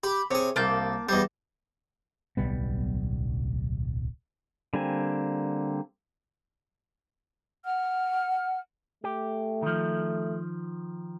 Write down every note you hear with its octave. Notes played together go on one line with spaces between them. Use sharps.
G4 B5
C3 G#4 C#5
C2 A#3 A5 G6
E2 G3 C5 D#5
D1 B1 G3 B3
D3 G3 A#3 C4 G#5
F#5 F6
A3 G4
D#3 F3